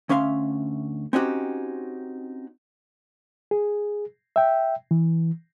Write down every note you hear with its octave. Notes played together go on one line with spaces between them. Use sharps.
D2 C#4 E5 F5 C6
C4 C#4 D#4 F#4 G4
G#4
E5 G5
E3